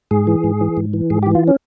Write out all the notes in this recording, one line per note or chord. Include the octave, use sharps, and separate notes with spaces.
G#2 G#4
E3
G#2
E3
G#2
E3
G#2 G#4
G4
E3
F4
C#4